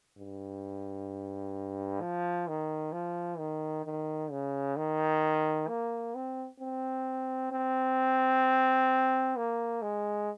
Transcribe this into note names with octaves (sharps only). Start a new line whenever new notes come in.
G2
F3
D#3
F3
D#3
D#3
C#3
D#3
A#3
C4
C4
C4
A#3
G#3